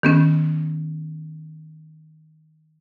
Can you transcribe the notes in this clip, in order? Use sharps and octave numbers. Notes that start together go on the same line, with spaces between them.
D#3 B3 C#4